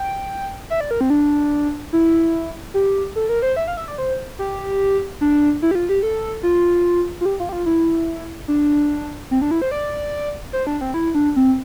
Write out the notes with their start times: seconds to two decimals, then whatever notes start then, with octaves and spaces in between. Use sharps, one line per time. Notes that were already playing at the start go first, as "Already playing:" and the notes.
Already playing: G5
0.70 E5
0.81 D5
0.91 A#4
1.01 C4
1.10 D4
1.93 E4
2.74 G4
3.16 A4
3.29 A#4
3.42 C5
3.56 E5
3.68 F5
3.77 E5
3.88 D5
3.98 C5
4.39 G4
5.21 D4
5.62 E4
5.71 G4
5.75 F4
5.89 G4
6.03 A4
6.43 F4
7.21 F4
7.25 G4
7.40 F4
7.49 G4
7.52 F4
7.66 E4
8.48 D4
9.31 C4
9.41 D4
9.51 E4
9.62 C5
9.71 D5
10.53 C5
10.67 D4
10.81 C4
10.94 E4
11.15 D4
11.36 C4